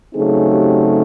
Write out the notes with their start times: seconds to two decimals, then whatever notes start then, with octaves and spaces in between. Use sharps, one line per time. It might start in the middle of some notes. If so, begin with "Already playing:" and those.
0.14 C#3 F#3 A3 C4 D#4 G#4
0.51 G4